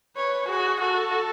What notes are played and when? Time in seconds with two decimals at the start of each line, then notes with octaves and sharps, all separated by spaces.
0.16 B4 C#5
0.49 F#4 G#4
0.81 F#4 A4